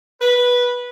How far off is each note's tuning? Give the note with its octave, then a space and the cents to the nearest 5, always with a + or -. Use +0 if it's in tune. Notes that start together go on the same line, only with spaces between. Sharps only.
B4 -10